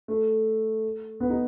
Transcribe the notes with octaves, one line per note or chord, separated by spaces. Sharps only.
A3
B3
D#4